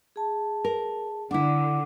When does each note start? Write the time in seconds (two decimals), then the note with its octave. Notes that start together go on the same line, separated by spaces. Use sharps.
0.16 G#4 A5
0.65 A#4
1.31 D3 D4 E4 F#5 D6